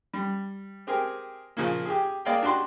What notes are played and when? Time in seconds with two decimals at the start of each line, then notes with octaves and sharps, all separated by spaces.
0.14 G3
0.87 C4 G4 G#4 A#4
1.57 A#2 C#3 F3 A#3
1.86 G4 G#4
2.25 A#3 G#4 D5 D#5 F5 G5
2.42 D4 F#4 G4 C6